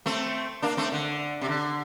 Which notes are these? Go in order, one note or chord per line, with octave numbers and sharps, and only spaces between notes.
A3 C4
A#3 D4
A3 C4
D3
C3
D3